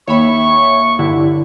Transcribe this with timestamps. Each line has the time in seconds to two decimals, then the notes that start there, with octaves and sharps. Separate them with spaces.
0.08 D#2 C#5 E5 B5 C#6
0.99 G2 D3 E4